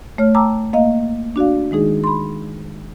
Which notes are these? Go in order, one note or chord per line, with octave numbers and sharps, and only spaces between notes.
A3 C#5 F6
G5 A5 A#5 D6 E6
A#3 D#5 F5
D4 F#4 D5 F5
D#3 G#3 D#4 G#4
B5 C6